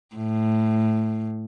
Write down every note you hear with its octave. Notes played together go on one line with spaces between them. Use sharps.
A2